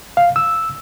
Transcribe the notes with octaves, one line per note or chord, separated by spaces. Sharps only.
F5
E6